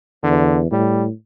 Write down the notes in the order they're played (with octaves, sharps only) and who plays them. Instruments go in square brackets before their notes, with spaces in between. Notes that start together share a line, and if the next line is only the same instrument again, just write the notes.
[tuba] E2 [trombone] D3
[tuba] A2 [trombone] G3